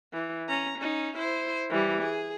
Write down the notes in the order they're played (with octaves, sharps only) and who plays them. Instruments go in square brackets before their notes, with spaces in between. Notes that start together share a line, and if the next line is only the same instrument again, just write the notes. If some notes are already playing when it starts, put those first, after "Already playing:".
[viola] E3
C#4 A#5
C#4 D#4
E4 C5
E3 G3
G#4